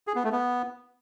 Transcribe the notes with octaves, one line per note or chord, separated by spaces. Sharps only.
G#4
B3
A3
B3